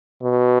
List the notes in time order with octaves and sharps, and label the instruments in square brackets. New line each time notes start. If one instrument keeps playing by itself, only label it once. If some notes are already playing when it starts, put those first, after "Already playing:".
[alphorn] B2